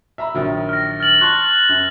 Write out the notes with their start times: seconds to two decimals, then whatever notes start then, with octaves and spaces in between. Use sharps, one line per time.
0.18 E5 A#5 B5
0.34 A#1 D#3 F#3
0.69 F6 A#6
1.00 F6 A6 F#7
1.21 A5 C6 C#6 F#6
1.69 F#2